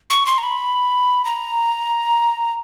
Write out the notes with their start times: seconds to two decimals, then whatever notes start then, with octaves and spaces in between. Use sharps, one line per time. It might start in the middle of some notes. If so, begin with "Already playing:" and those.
0.10 C#6
0.26 C6
0.38 A#5
0.43 B5
1.25 A#5